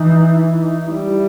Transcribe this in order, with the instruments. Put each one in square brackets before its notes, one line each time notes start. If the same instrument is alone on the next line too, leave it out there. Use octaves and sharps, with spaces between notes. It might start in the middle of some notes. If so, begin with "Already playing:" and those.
Already playing: [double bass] E3 [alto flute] D#4
[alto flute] E4
D#4
[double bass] G3 [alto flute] E4